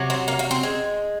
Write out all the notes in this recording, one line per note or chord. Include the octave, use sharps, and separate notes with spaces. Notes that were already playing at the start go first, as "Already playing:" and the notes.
Already playing: C3 F#3
C4
A#3
A#3
C4
G#3 C4